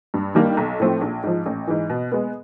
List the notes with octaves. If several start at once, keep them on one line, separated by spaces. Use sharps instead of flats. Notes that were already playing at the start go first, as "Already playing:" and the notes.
G2
D#3 G3 A#3 D4
B1
A2 F3 A3 C4
A#1
G#2 F3
A1
G#2 E3
B2
G#3 B3